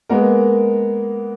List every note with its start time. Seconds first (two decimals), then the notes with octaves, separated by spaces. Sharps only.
0.09 G#3 A#3 B3 A#4